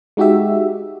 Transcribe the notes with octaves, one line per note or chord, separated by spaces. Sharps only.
G#3 D#4 F#4 G4 E5